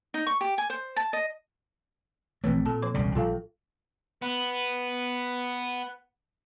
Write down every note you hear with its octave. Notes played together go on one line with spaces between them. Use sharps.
D#4
C#6
G4
G#5
C5
A5
D#5
A#1 E3 A3 C4 B4 C#5
A#2 A4 A5
F3 C#5 D6
E1 C#2 C#3 G3
A#1 F4 A4 F5
B3 B4